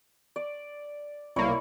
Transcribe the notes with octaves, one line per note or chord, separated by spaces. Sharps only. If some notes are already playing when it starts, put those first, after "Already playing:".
D5
C2 A#3 E4 C#5 D5